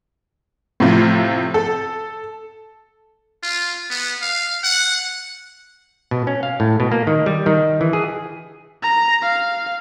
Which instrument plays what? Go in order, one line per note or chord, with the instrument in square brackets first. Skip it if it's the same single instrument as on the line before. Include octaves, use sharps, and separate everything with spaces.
[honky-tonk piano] A2 C3 F3 F4
A4
[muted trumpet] F4
B3
F5
F#5
[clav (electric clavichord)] B2
C#4
F5
A2
B2
A#3
D#3
G3
D#3
E3
G#4
[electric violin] A#5
F5